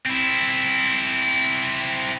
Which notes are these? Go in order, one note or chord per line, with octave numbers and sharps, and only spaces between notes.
C4 E4